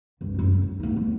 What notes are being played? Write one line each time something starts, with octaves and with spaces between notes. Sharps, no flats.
C2 G2
C2 F#2
F#3
D1 D#4
F#3 B3